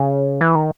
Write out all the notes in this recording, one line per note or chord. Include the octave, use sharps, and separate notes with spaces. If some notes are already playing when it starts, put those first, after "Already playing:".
Already playing: C#3
E3
D#3